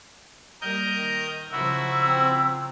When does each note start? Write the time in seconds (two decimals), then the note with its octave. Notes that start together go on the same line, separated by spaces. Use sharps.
0.62 G3 A#3 A#4 D#5 G6
0.96 D#3
1.52 C#3 F3 E4 F#4 A#5 E6
2.01 C4